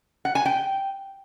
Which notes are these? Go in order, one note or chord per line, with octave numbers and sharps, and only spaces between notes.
F#5
G#5
G5